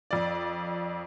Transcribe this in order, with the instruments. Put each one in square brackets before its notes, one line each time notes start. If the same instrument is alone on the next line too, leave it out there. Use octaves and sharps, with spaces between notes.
[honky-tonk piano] F2 D5